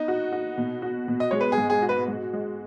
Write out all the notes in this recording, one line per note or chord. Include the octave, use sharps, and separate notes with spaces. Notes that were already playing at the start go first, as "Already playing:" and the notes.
Already playing: B3 D#4
F#4
F#4
B2
F#4
B2
D#5
G#3 C#5
B4
G#4
G#2
G#4
F#4
B4
G#3
G#3